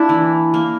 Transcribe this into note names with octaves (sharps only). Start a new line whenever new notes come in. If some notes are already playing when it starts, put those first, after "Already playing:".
Already playing: A#3 D4 E4
E3
A#3